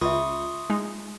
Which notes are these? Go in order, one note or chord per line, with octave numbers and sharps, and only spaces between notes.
C#2 F4 E5 C6 C#6 D#6
G#3 D#4